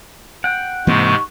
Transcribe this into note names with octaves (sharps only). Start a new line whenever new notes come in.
F#5 G5
G#2 C3 E3 G#3 A#3 C4 C#6